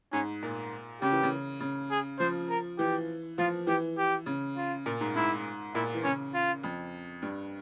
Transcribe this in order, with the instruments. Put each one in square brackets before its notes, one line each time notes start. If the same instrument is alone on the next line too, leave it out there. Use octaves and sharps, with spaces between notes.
[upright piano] G#2 [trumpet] C#4
[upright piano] A#2
[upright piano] C#3 [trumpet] G4
[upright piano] E3
C#3
C#3
[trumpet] G#4
[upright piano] F3 [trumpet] C5
[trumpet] A#4
[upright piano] E3 [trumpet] G4
[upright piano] F3 [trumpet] F4
[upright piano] E3 [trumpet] G4
[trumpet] G4
[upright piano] C#3
[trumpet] F4
[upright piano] A#2
G#2
[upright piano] G#2 [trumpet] E4
[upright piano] A#2 [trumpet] E4
[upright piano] E3
[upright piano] C#3 [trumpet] C#4
[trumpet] F4
[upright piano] F2
G2